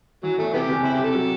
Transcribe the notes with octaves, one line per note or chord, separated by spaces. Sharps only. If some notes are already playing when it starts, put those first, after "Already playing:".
E3 F#3
E2 A3
C3 B3 E4 G4
F#1
C4 E4
G4
C3
A4
F#3